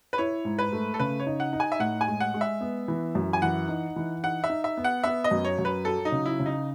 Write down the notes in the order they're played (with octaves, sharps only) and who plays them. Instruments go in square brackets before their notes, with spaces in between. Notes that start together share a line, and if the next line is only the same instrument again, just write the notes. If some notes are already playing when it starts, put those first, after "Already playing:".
[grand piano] B4
[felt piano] E4 [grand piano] C#5
[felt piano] G#2
[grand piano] B4
[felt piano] A3
[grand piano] A4
[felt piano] C#3 [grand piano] B4
[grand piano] C#5
[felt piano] D#4
[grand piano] F#5
[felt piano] D#4
[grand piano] G#5
E5
[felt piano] A2 [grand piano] F#5
[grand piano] G#5
[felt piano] G#3
[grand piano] F#5
[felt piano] G#3
[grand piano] E5
[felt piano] B3
E3
F#2
[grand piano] G#5
[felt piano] E3 [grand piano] F#5
[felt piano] D#4
E3
[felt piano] D#4 [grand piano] F#5
[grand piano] E5
[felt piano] D#4
[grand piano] E5
[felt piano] B3
[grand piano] F#5
[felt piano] B3 [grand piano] E5
[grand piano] D#5
[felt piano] F#2
[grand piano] C#5
[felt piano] F#2
[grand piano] B4
[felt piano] F#3 [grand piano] A4
[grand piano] D#4
[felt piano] C#3
[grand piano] E4
[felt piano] C#3
[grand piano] D#4